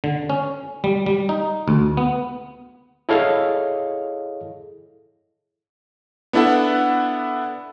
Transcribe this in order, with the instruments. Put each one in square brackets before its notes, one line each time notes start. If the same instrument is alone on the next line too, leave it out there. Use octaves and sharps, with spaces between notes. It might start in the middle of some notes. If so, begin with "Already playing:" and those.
[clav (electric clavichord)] D3
C#4
G3
G3
D#4
D2
B3
[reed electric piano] E4 G#4 A4 C#5 D#5 F5
[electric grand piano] B3 D4 E4 A4 F#5